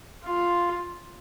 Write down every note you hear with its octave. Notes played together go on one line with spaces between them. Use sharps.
F4